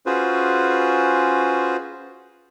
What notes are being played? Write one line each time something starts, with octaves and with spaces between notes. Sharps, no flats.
C#4 F4 F#4 G#4 B4 C5